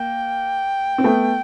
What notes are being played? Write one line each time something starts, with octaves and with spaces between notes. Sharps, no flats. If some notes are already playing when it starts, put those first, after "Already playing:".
Already playing: A#3 G5
C4
A3 B3